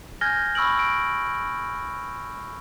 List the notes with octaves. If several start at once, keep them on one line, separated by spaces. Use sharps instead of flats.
G#5 F6 G6 G#6 A#6 G7
B5 C#6 E6 F6 D7 F#7
E6 D7